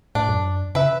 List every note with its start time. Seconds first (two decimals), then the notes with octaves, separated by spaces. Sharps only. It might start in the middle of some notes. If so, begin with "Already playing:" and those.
0.15 A2 D4
0.29 F#2
0.75 C#3 B4 E5